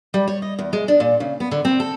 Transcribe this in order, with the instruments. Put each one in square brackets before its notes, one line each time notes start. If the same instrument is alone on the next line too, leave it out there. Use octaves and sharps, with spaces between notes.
[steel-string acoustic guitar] G3
C#5
D#5
E2
G#3
D4
A#2
C#3
B3
D3
C4
A4